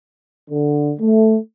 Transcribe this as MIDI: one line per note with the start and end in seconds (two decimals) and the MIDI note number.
0.50 0.92 50
1.00 1.36 57